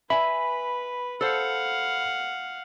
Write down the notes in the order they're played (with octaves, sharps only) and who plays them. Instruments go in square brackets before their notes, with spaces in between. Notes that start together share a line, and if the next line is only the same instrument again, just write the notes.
[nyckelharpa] B4 [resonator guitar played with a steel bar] E5 G#5 [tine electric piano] B5
[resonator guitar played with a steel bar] A4 C5 [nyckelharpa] F5 F#5